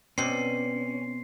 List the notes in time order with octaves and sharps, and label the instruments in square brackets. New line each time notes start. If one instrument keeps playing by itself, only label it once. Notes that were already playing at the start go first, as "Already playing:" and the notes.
[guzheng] B2 C4 D5 [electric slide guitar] C#4 [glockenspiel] C6 C7